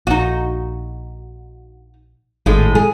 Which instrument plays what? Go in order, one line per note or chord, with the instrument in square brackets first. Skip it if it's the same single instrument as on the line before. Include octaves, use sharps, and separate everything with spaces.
[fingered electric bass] A#1 [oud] D#4 F#4
[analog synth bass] G#1 [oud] A2 G#3
[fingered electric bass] G#3 [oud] G#4